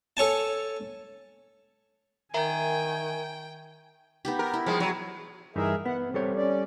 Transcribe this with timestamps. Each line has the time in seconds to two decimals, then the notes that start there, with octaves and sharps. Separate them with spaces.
0.17 A4 C#5 G#5 A5
2.34 D#3 A#4 E5 G5 G#5 A#5
4.25 B3 D#4 G4
4.39 A#4
4.54 E4
4.66 F3 G3 G#3
4.80 F#3 F#4
5.56 G2 E3 D#4 G#4 A#4 E5
5.85 B3 F#5
6.02 C3
6.14 G3 A4 C#5
6.36 C#4 D5